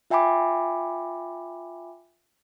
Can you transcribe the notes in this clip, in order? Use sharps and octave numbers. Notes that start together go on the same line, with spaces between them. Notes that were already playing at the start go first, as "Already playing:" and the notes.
F4 E5 G5 G#5 B5 D6